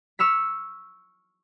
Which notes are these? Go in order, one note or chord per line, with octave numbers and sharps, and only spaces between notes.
C#6 E6 F6 B6